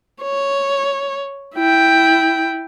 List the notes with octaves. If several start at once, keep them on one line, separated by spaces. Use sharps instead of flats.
C#5
E4 G5